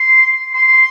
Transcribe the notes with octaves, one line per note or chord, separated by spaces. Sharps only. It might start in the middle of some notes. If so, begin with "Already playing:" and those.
Already playing: C6
C6